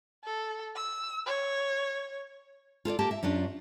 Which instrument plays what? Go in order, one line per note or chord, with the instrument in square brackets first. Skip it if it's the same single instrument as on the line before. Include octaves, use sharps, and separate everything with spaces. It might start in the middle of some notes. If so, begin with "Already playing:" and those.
[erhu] A4
E6
C#5
[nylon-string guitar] F4 A4 C#5 D5
A#3 G4 A5
E5
F#2 C#4 D4 F4